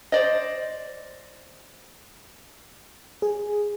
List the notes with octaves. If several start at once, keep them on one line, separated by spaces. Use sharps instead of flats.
C5 D5 D#5
G#4